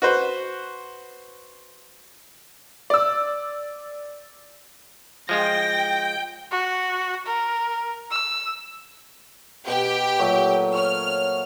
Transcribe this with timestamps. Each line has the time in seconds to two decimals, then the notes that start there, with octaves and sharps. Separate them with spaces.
0.02 F#4 B4 C5
2.90 D5 E6
5.29 F3 G#3 F4 G5 A#6
6.51 F#4
7.26 A#4
8.11 E6
9.68 B2 G4 G5
10.19 A#2 F#3 A3
10.74 C5 C#5 F6